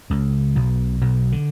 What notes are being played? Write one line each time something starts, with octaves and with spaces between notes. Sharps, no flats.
C#2 C#3
B1 B2
B1 B2
D3